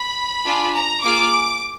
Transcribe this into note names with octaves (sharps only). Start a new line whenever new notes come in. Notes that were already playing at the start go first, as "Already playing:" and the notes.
Already playing: B5
D4 F4 G#4
A#5
A#3 F4 G#4 D6